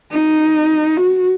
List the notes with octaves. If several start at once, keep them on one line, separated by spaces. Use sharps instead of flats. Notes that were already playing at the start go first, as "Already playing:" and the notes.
D#4
F#4